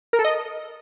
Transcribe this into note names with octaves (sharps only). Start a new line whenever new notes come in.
A#4
A4
D#5